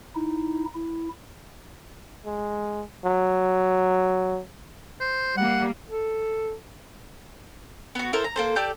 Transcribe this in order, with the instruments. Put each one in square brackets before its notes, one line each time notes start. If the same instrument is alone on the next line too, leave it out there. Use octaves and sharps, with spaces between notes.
[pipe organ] D#4 E4
E4
[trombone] G#3
F#3
[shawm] C5
[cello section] G3 A#3 [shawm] F#5
[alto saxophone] A4
[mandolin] B3 F#4
E4 A4 A#4 C5
A#5
A#3 A4 C5
G4 A4 D5 G6